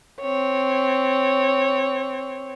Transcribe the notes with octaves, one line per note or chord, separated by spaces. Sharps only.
C4 C#5